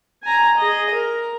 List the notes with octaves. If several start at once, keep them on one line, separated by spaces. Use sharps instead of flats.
G#5 A#5
G#4 D#5
A#4